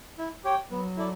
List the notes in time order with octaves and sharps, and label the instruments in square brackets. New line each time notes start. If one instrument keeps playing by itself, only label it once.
[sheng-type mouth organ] E4
G4 C#5 G5
[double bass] F#3 [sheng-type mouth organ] B3
[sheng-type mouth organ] E4 A4 D5